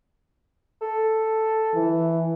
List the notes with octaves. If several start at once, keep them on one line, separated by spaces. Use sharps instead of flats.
A4
E3